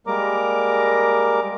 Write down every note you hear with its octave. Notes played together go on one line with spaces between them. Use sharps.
G3 G#3 A#3 A#4 A#5 D6